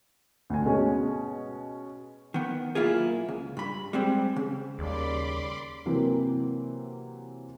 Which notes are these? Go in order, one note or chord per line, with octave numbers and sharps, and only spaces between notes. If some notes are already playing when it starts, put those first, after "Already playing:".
D2 G#5
B2 G#3 C#4
D#3 B3
B1 A#3 E4 F4 G#4
C#2
G2 B5
G3 G#3 C4
C#3
D#2 C#3 G3 D5 B5 C6 D6
C3 E3 F#3 A#3 C4